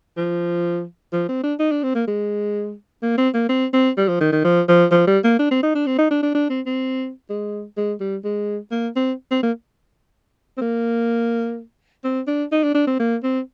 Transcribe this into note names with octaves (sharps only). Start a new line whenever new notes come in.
F3
F3
C4
D4
D#4
D4
C4
A#3
G#3
A#3
C4
A#3
C4
C4
G3
F3
D#3
D#3
F3
F3
F3
G3
A#3
D4
C4
D#4
D4
C4
D#4
D4
D4
D4
C4
C4
G#3
G#3
G3
G#3
A#3
C4
C4
A#3
C4
A#3
C4
D4
D#4
D4
D4
C4
A#3
C4